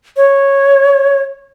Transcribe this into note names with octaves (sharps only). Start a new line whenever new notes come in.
C#5